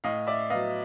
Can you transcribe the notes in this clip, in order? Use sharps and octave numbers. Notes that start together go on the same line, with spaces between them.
A2 D#5 F5
D5 E5
F#3 B3 D#5 F5